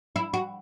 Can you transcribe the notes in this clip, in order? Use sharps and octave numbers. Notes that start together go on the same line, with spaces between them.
E4
F#4